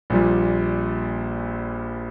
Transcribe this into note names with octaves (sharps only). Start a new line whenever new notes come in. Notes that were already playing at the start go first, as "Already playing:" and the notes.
A#1 A#2 G3